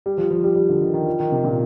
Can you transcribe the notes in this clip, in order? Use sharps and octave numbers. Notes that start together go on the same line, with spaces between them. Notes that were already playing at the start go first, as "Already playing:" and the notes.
G3
F3
F3
G3
G3
D3
D#3
D#3
F3
D#3
C3
A#2